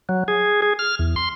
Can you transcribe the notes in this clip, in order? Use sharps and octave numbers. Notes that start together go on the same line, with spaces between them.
F#3
G#4
G#4
F6
E2
C6